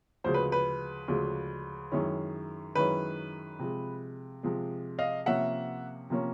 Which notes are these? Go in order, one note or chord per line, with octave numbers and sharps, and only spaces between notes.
D2 C#3 F3 G#3 C5
B4
B4
D2 C#3 F3 G#3
F#2 D#3 G#3 C#4 E4
F#2 D#3 G#3 C#4 E4 B4
C3 F3 G#3
C3 F3 G#3
D#5 F5
C3 F3 A#3 C#4 E5 F#5
C3 F3 A#3 C#4